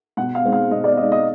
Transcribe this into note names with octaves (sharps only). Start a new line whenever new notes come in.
B2 F#5
F5
G#3 C4 D#4
F5
B2 D#5
D5
G#3 C4 D#4 D#5
D#5